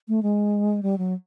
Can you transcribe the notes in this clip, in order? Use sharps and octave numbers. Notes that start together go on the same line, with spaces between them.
A3
G#3
G3
F#3